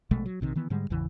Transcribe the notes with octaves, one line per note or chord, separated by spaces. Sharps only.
A#1 B2 G#3 A3
F#3
A#1 C3 D#3
D#3 E3 B3
G#2 D3 G3 G#3
G#1 E2 C#3 E3